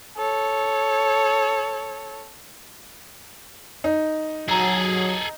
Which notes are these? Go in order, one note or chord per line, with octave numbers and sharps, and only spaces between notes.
A4 C#5
D#4
F#3 G#4 A4 A#5